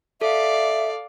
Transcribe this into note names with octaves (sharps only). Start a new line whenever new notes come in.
A4 D5 E5 F5